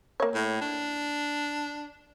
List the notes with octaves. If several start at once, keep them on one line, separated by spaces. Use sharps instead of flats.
A#3 C#5
A2
D4